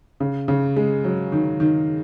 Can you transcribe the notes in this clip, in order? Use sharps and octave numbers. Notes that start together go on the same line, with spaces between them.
C#3
C#3
G#3
F#3
D#3
D#3